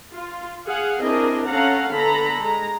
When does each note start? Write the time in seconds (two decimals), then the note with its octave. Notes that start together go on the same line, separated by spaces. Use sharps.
0.12 F4
0.67 G#4 F5 F#5
1.00 C4 D4 E4 G#4 A#4 D#5
1.48 C#4 A4 F5 F#5 A#5
1.93 D3 B3 A4 A#5 B5
2.41 G#3 A#5